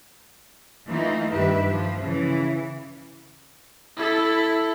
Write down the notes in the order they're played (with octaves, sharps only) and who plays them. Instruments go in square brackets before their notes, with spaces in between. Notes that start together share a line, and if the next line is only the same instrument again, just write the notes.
[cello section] E3 A3 A#3 D#4 F4
G2 D#3 G4 B4 E5
F3
C#3 E3
[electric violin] E4 A4